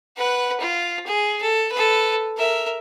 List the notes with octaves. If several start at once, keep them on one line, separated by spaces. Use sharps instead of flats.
B4 F#5
F4
G#4
A4
A4 B4
A#4 E5